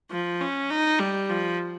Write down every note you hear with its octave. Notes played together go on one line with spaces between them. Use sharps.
F3
C#4
D#4
G3
F3